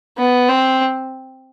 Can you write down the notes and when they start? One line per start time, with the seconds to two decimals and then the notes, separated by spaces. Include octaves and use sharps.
0.18 B3
0.49 C4